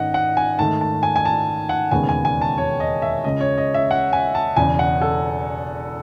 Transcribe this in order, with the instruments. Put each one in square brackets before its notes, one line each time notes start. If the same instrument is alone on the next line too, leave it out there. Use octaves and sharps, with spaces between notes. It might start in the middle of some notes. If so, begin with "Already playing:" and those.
Already playing: [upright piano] G#1 D#3 A3 C#4 D#5 F#5
F#5
G#5
G#2 D#3 A3 A5
A5
G#5
G#5
A5
F#5
E1 D#2 C#3 G#3 B3 G#5
G#5
G#5
A5
C#5
D#5
E5
C#2 C#3 G#3 C#4 D#5
C#5
D#5
E5
F#5
G#5
A5
E1 E2 C#3 G#5
F#5
A4